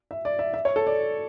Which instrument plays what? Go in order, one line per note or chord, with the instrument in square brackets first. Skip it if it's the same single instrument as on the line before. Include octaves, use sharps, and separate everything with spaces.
[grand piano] E5
D5
E5
E5
C#5
A4
D5